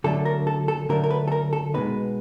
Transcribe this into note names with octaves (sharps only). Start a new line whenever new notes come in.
D3 F#3 A3 D4 A4
A#4
A4
A4
D3 F#3 A3 D4 A#4
A#4
B4
A4
A#4
A4
B2 G#3 B3 D#4 B4